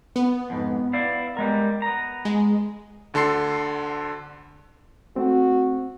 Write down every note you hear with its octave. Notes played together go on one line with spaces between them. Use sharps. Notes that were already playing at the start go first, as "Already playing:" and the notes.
B3
F2 G#2
E4 D5 F5
G3 G#3 A#4
B3 A#5
G#3
D2 D3 A4 C6 C7
A3 C4 F#4